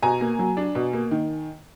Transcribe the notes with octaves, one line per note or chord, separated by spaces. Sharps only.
B2 G#5 A#5
A#3
F#3
D4
B2
A#3
D#3